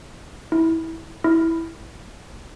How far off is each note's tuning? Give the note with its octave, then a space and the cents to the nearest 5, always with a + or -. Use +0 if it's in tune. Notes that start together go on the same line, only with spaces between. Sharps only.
E4 -20
E4 -10